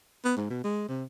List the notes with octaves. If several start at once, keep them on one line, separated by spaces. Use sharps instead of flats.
B3
G#2
B2
G#3
C3